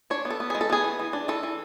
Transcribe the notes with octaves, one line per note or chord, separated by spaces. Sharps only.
D4 C#5
B3
A4
B3
G#3 G#4
A4
B3 G#4
E3
E3
D4
E3 A4
E3